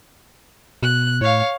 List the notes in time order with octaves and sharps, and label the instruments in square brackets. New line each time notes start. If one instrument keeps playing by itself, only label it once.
[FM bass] B2 [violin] F#6
[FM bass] A2 [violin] C#5 F5